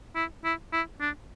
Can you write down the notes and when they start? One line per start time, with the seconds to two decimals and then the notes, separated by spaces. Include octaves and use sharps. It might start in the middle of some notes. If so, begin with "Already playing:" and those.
0.15 E4
0.44 E4
0.73 E4
1.01 D4